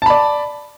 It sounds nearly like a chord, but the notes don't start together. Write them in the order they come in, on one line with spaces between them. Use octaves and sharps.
A5 B5 D5